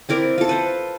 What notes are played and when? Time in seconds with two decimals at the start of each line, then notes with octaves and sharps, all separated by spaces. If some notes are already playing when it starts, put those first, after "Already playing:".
0.09 C4 E4 A#4 D5
0.38 F4 A4
0.49 B4 C5